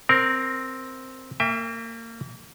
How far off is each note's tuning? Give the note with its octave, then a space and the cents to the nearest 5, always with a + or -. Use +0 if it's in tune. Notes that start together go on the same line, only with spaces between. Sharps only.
C4 +0 A#4 +0
A#3 -30 E5 +10 G5 +35